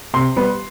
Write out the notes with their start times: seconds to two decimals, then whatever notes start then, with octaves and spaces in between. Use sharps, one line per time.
0.14 C3 C6
0.37 G3 B3